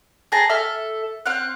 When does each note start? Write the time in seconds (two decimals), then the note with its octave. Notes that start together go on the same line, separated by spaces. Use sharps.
0.32 G#4 G5 A5 A#5
0.49 A4 E5 F6
1.26 C4 F5 F#5